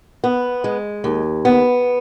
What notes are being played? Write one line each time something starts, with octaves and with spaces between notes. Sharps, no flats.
B3
G#3
D#2
B3